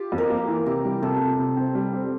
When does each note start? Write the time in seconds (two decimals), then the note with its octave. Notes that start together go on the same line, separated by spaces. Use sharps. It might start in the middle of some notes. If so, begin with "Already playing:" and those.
Already playing: F4 G4
0.12 F2
0.18 A#4
0.30 A#3
0.48 E3
0.66 C3 G4
0.84 G3
1.02 C3 A4
1.21 C3
1.39 C3
1.57 C4
1.75 G3
1.93 C4